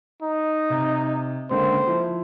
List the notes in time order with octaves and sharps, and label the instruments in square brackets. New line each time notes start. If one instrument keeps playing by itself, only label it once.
[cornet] D#4
[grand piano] C3
[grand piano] C#2 D3 A#3 [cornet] C5
[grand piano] F3 E4